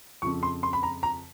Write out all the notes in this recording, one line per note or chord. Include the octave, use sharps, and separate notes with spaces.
F2 C#3 F3 C#6
C6
C6
B5
A#5
A#5